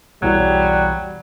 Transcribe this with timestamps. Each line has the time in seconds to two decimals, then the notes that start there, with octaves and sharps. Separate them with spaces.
0.22 B1 E2 E3 F#3 G3